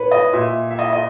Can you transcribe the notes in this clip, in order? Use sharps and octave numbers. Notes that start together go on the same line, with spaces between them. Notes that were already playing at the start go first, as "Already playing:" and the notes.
Already playing: A#2 B4 C#5
D#5
A#2 E5
E5
D#5
D#5